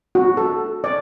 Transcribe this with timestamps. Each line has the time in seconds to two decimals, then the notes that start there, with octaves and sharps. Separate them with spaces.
0.15 F#4
0.37 A4
0.84 D5